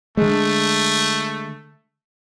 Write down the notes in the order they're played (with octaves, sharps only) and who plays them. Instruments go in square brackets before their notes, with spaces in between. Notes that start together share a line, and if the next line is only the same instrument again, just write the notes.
[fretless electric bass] D3 G#3 [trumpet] A3